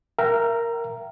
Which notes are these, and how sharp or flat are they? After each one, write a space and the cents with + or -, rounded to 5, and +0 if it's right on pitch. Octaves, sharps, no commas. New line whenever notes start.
A#4 +0 E5 +40 G5 -35